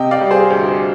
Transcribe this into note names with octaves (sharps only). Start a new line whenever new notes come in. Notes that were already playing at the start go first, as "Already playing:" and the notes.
Already playing: C3 D#5 G5
D5 F5
G3
G#4 C5
D2